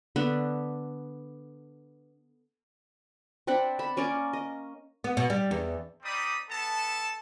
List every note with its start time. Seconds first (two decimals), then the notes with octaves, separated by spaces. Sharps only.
0.16 D3 B3 D4 B4
3.47 C4 D4 F#5 B5
3.79 A5 B5
3.97 A#3 C#4 A#4 D5
4.33 D#5
5.04 B3
5.17 B2
5.30 G3
5.51 E2
6.03 G3 C4 D#4 D5 B5 D#6
6.49 B3 A4 A5